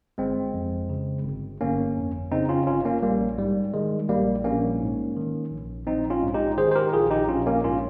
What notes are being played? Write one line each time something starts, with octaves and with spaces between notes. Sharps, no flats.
G1 G#3 C4
F2
C#3
G1
G1 A#3 C#4
F2
C#3 C4 D#4
C#4 F4
G1 C#4 F4
A#3 C#4
A#1 G3 A#3
G#2 G3
D#3 G#3
A#1 G3 A#3
A#1 A#3 C#4
G#2
D#3
A#1
A#1 C4 D#4
C#4 F4
G#2
D#4 G4
D#3 G#4 C5
C5
G4 A#4
A#1 F4 G#4
D#4 G4
A#1 C#4 F4
A#3 C#4
G#2 C#4 F4